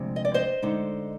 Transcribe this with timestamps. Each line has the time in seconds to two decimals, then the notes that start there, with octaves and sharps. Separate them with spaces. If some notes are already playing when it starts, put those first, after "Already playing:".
Already playing: D2 C3 F3 G#3
0.16 D#5
0.25 D5
0.34 C5 D#5
0.62 D3 G#3 D#4